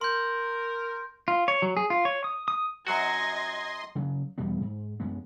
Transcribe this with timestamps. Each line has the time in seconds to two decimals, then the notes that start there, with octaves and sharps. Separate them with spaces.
0.01 A#4 C6 G6
1.28 F4
1.48 C#5
1.62 F#3
1.77 G#4
1.90 F4
2.05 C#5
2.24 D#6
2.48 D#6
2.87 F#2 F#3 F#4 D#5 C6 G#6 A#6
3.95 C#3 F#3
4.38 E2 B2 G3 B3
4.61 G#2
5.00 F#2 G#3 B3